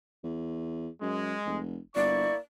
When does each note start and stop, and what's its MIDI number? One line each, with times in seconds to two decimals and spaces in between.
0.24 0.88 40
1.01 1.35 42
1.01 1.61 56
1.46 1.78 29
1.95 2.29 31
1.95 2.37 58
1.95 2.37 64
1.95 2.35 74
1.95 2.37 85